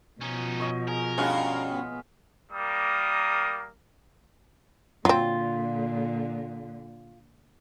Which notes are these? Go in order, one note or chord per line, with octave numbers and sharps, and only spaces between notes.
B2 F3 C#4 D#4
C#5 D#5
G#4 A#4
G2 G#3 C#4 F#4 F5
B3
G3 A#3 A#4 D#6
A#2 D3 F#3 C4 F4